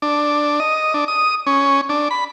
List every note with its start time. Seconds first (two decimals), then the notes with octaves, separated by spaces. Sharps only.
0.02 D4
0.60 D#5
0.94 D4
1.08 D#6
1.47 C#4
1.89 D4
2.11 B5